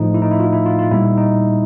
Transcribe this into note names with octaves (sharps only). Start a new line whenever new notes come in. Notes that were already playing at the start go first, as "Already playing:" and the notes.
Already playing: A2 F3 A3 D#4
E4
D#4
E4
F4
E4
F4
F4
A#2 G3 B3 D#4 E4
D#4